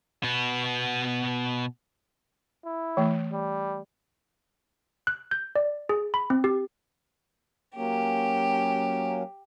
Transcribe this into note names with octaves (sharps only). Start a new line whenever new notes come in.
B2 B3
E4
E3 A3
G3
F#6
G6
D5
G#4
B5
C4
G4
F#3 A#3 C#4 G4